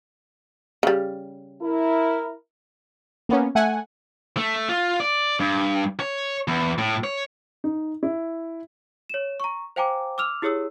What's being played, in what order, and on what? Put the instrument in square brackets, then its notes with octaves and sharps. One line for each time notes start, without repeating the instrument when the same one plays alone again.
[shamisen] C#3 G3
[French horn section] E4 A#4
[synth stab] A#3 B3 C#4
A3 F#5 G#5
[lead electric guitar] A3
F4
D5
G2
C#5
E2
A2
C#5
[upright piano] D#4
E4
[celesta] C#5 E7
A#5 C#6
C5 F5 G5 G#5 A#5 D6
D6 E6 F6 F7
E4 G4 G#4 C#5 D#6 E6